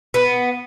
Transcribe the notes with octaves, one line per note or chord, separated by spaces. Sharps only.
B3